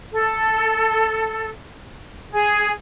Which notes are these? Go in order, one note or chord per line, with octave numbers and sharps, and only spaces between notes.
A4
G#4